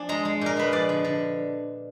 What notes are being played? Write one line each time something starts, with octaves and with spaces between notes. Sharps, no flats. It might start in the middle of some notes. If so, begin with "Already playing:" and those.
Already playing: F3 D4 G#5
G#3 A#5
G#3
A#2 A#4
G#3 B4
F3 D5
D3
D3